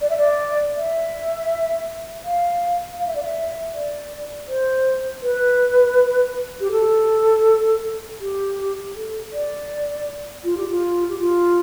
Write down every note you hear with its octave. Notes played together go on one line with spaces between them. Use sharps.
D5
E5
D5
E5
F5
F5
E5
D5
E5
D5
C5
B4
G4
A4
G4
A4
D5
F4
G4
F4
G4
F4